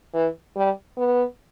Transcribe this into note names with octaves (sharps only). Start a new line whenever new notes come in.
E3
G3
B3